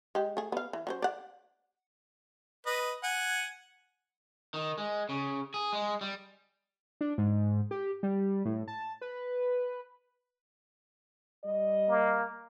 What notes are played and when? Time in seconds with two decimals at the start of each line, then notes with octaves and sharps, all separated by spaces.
0.15 G#3 G4
0.37 A3 G#4
0.52 B3 F5
0.73 E3
0.87 F#3 C#4 C5
1.02 D5 F#5
2.66 B4 D#5
3.03 F#5 G#5
4.54 D#3
4.78 G#3
5.09 C#3
5.54 G#4
5.73 G#3
6.01 G3
7.01 D4
7.18 G#2
7.71 G4
8.03 G3
8.45 A2
8.68 A5
9.01 B4
11.45 G3 D#5
11.89 A#3